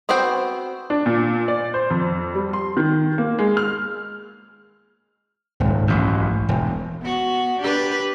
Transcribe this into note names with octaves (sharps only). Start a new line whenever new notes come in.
B3 C4 F#4 C5 G5
D4
A#2
D5
C5
F2
G3
C6
D#3
A#3
G#3
F6
D#1 C2 G#2
A1 F#2
E1
B3 F#4
D4 G4 B4